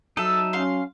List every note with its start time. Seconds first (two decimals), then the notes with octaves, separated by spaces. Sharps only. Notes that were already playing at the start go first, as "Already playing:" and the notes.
0.17 F#3 D#4 A4 E5
0.53 C#4 F5 C6